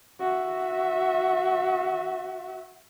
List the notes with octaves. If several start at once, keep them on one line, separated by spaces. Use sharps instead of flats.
F#4 E5